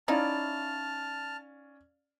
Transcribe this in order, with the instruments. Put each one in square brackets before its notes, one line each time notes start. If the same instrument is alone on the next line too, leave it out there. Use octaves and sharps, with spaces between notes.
[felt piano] C#4 D5 F5 [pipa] D#4 E4 [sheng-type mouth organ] A5 F6